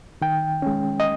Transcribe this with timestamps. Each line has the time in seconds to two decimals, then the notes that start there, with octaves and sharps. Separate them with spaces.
0.21 D#3 G5
0.62 G#3 C#4
1.00 D#5